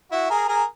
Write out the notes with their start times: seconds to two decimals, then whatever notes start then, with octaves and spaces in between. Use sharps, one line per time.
0.12 E4 F#4
0.30 G#4 A#4
0.48 G#4 A#4